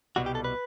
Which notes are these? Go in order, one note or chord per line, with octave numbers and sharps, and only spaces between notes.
C2 B2 G3 F#4
G4
A4
B4